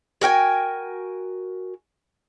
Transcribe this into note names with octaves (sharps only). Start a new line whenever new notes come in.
F#4 A#4 G5 G#5